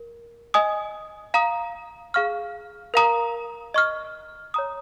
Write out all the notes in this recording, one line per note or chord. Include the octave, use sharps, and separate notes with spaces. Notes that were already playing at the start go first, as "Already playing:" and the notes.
Already playing: A#4
D#5 G#5 D#6
F5 A#5 D#6
G#4 F5 C#6 F6
A#4 F5 A#5 D#6
D#5 C#6 F6
C#5 A#5 D#6